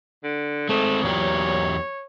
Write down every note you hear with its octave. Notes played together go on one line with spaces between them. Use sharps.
D3
G#3 A3 C4
E2 A#2 F#3 G4 C#5